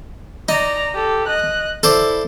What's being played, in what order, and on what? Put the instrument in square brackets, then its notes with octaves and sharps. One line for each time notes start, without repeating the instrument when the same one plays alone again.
[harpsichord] D#4 [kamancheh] D5 A#5
[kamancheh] G4 A4
D#5 F#6
[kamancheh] E4 [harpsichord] A4 C5 D5